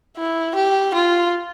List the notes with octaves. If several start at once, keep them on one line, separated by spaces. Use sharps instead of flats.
E4
G4
F4